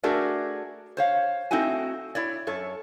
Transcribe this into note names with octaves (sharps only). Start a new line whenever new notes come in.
A3 D4 F#4 G#4 A#4 D5
C5 C#5 F5
A3 C4 D#4 E4 F#4 G#5
E4 C#5 D5
F#2 A4 C#5